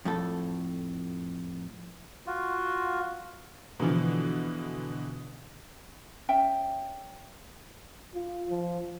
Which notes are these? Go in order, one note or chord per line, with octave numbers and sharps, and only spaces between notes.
F2 A2 A4
F4 F#4
B2 D3 E3 F3
C#4 E5 G5
F4
F3